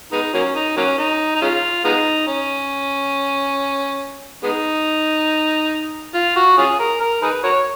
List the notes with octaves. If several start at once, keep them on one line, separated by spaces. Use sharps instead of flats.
G#3 B3 D#4
F#3 A#3 C#4
D#4
F#3 A#3 C#4
D#4
D#4
G#3 C#4 F4
G#3 B3 D#4
C#4
G#3 B3 D#4
F4
F#4
C#4 F4 G#4
A#4
A#4
D#4 G#4 B4
F#4 A#4 C#5